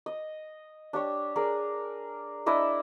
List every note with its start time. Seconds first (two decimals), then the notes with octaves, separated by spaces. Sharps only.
0.06 D#5
0.93 D4 G4 C#5
1.36 G#4 A#4 D5
2.46 D4 E4 D5 D#5